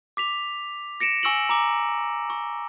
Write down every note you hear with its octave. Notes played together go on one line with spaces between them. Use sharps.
D6 B6 F7
A#6 C#7 D7 E7
G#5 C#6 E6 A#6 D7 F#7
A#5 D6
C#6